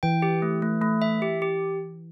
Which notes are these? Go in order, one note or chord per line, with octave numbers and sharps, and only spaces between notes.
E3 G5
G4
A3
A3
A3
E5
G4
G4